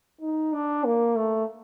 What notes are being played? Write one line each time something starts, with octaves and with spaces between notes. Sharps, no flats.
D#4
D4
A#3
A3